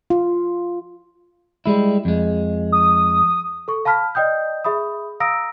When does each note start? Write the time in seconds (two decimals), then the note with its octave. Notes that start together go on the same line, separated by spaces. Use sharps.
0.10 F4
1.66 G3 G#3 E4
2.05 F2 G#3
2.72 D#6
3.68 A4 C#6
3.85 F5 A5 B5 F6 B6
4.15 D5 D#5 G5 D#6 G6
4.65 G#4 E5 B5 D#6
5.20 F5 A#5 D#6 E6 A#6 D7